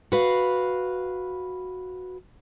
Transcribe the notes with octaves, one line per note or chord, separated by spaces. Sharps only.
F#4 B4 F5